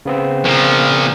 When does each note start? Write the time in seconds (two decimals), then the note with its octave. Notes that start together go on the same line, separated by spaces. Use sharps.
0.06 C#3 B3 C4
0.45 A#2 F3